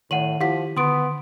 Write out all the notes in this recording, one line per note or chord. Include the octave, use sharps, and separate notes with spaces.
A2 D#3 F#5 D#7 F#7
F3 E4 G4 F5 F#5 B6
D3 B3 C6 D#6 D7